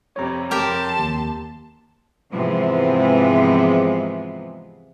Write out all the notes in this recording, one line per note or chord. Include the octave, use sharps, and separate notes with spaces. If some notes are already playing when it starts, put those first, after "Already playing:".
F2 C3 G3 C#5 A#5
F2 G4 A#4 A5 C6
D#2
G#2 C3 E3 F3 G#3 B3